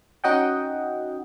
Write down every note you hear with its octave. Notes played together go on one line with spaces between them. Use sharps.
C#4 D#4 F#4 D#5 F#5 G5